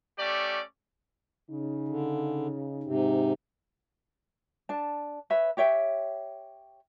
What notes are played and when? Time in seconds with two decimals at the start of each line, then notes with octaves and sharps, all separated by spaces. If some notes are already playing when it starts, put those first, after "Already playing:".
0.19 A3 C#4 G4 D5
1.50 C#3 D#4
1.88 D3
2.84 G#2 C3
4.69 D4 A5
5.30 B4 C#5 E5 B5
5.57 G4 C#5 E5 G5